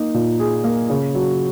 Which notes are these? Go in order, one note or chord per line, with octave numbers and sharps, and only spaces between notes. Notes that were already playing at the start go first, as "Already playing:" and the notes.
Already playing: A#3 D#4
A#2
G#4
A#3
C#3
F#3